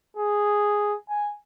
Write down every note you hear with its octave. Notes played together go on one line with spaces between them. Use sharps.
G#4
G#5